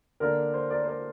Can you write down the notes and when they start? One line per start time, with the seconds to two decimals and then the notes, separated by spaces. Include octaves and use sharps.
0.20 D3 A#3 D4 A#4 D5
0.54 C5
0.70 A#4 D5
0.84 C5
0.88 A#4 D5